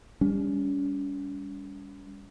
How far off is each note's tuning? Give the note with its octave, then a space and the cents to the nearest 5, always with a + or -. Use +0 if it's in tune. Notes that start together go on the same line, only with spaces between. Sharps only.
G3 +30 C#4 +35